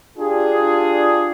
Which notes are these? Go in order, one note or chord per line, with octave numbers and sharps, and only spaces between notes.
D4 F4 G4 G#4